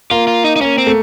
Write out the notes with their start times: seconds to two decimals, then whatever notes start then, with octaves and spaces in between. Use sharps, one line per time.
0.11 A#3 F4
0.27 F4
0.44 D#4
0.56 D#4
0.61 A#3 C#4
0.78 C4
0.87 A3